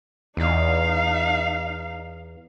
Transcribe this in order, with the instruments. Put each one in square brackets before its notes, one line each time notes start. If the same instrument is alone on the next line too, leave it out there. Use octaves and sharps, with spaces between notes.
[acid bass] E2 [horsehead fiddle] D#4 F5